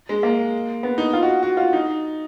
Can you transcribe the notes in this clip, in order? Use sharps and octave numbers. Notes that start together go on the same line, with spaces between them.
G#3
A#3
B3
D#4
F4
F#4
F#4
F4
D#4